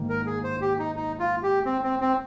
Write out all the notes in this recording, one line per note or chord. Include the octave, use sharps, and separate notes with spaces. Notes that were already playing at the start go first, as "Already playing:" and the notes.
Already playing: G#2 D#3 A#3
A#4
G#4
C5
G4
D#4
D#4
F4
G4
C4
C4
C4